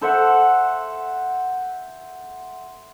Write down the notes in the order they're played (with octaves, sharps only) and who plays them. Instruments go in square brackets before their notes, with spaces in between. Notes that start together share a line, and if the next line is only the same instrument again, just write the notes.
[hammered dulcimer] A4 C5 E5 F#5